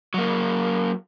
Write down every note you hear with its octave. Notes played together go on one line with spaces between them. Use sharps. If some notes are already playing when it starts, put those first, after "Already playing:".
F#3 A#3